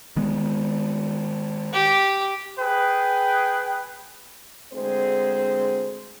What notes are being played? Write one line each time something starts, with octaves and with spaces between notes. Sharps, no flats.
D#3 G#3 B3
G4
G#4 B4 G5
D2 G#3 C4 G#4 C5